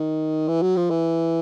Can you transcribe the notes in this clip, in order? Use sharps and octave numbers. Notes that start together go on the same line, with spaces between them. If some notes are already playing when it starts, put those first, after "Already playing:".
Already playing: D#3
E3
F#3
F3
E3